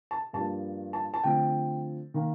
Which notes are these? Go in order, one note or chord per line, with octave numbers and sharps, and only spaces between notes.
A5
G2 F3 A#3 A5
A5
A5
D3 F3 A3 C4 G5
D#3 A#3